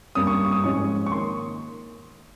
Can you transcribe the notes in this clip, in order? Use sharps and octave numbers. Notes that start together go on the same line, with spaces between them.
G2 G3 A#3 C#4 D#6
C#6
C#6
D#6
G#2 F3 G#3 C#4 C#6
C#6
D#3 A#3 C6